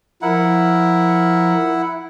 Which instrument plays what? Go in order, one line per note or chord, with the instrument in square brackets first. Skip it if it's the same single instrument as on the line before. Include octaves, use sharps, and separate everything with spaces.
[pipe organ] F3 A#4 [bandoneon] E4 F#5